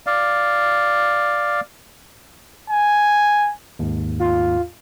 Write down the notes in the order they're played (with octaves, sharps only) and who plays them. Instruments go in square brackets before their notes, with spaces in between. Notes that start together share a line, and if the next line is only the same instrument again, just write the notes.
[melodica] D5 F5
[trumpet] G#5
[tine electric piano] D#2 G#2
[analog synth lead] F4